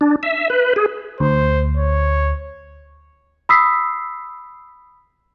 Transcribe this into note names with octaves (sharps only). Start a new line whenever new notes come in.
D4
E5
B4
G#4
D2 C5
C#5
B5 D#6 E6 B6 C7